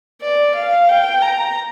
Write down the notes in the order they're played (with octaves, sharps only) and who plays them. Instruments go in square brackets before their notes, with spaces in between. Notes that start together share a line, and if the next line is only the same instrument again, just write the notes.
[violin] D5
F5
G5
A#5